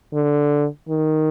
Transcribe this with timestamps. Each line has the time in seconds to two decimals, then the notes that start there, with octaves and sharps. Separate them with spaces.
0.13 D3
0.89 D#3